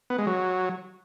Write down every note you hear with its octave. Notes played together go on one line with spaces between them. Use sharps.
B3
G#3
F#3